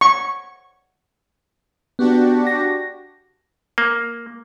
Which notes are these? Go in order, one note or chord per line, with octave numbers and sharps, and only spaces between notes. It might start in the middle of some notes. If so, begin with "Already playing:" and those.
C#6
B3 D4 F#4 G4
A#6
A#3